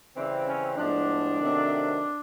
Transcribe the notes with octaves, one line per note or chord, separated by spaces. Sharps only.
C#3 E3 G3 C4
C#4
A2 F3 G#3 B3 D4
C3 D#3 F#3 A3 C4